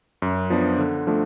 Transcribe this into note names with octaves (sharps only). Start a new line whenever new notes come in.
F#2
F3 B3 D4
D3
F3 A3 D4